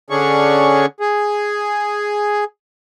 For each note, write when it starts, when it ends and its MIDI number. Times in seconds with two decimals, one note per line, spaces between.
0.10 0.86 50
0.10 0.86 61
0.10 0.86 62
0.10 0.86 68
0.10 0.86 85
1.00 2.44 68